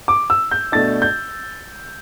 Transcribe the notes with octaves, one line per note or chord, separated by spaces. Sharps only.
D6
E6
G6
B2 A3 D4 A6
G6